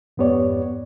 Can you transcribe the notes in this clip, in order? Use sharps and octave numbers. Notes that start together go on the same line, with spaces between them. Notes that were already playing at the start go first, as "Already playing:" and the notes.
F2 G#2 B3 G4 C#5 D5